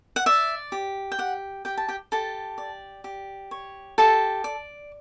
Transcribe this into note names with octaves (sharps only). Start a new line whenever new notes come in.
F#5
D5 E5
G4
G5
G4 F#5
G4 G5
A5
G4 G5
G4 A4 A5
D5
G4
C#5
G4 A4 A5
D5